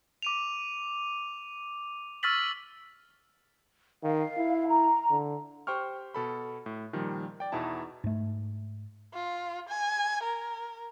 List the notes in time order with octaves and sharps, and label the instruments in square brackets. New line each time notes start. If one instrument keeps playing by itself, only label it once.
[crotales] D6 D#7 F7
C#6 E6 F6 A6 B6 F#7
[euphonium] D#3 [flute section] F5
[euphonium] E4
[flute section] A#5
[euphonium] D3
[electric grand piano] G4 C5 G5 C#6 F6
B2 A4 B5
A2
A#2 D#3 F3 G3
D5 G5
E2 B2 D#4 E4 A5
[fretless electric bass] G#2 A3
[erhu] F4
G#5
A#4